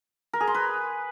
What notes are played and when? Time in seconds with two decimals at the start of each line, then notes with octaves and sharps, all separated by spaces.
0.33 A#4
0.40 G#4
0.47 C6
0.54 B4